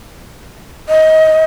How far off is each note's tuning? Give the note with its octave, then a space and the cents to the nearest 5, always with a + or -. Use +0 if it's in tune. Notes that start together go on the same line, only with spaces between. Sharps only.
D#5 +20